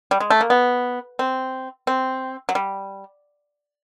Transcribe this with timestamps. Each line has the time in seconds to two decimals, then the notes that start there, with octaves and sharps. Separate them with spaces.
0.11 G3
0.20 G#3
0.30 A3
0.41 A#3
0.50 B3
1.19 C4
1.87 C4
2.49 F#3
2.55 G3